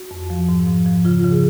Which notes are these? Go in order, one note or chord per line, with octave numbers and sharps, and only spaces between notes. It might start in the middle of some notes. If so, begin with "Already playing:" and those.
Already playing: F#4
F2
F3
G#2
F3
F3
C#3 F4
C#3
G#4